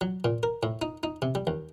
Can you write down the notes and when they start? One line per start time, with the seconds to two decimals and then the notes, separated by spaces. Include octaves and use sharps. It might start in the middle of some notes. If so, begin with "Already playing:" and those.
0.01 F#3
0.25 A#2
0.43 A#4
0.63 A2
0.82 D#4
1.03 D#4
1.22 C3
1.35 G3
1.47 D#2